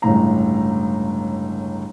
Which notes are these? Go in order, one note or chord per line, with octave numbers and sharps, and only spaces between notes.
G1 C#2 A2 A#5